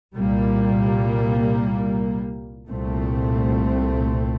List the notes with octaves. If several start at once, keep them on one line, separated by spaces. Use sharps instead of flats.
C2 A#2 G3 A#3
C2 A#2 A3 C4